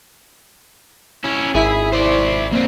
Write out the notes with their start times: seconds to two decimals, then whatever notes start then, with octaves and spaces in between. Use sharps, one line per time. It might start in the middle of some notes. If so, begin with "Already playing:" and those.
1.24 C#4 E4
1.54 G#1 E4 G#4 B6
1.92 C5 D5
2.52 A#3 C4